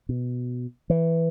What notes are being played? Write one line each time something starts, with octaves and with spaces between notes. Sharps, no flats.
B2
E3